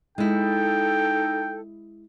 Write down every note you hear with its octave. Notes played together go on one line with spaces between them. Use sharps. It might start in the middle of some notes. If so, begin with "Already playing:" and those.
G#3 D#4 E4 A4 G5